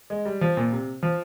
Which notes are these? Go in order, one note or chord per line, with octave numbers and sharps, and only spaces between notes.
G#3
G3
F3
A#2
C3
F3